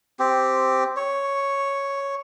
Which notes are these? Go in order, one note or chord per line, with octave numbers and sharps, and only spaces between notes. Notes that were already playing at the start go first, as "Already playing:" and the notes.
C4 G4
C#5